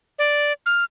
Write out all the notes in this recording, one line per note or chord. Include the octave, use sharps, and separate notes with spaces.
D5
F6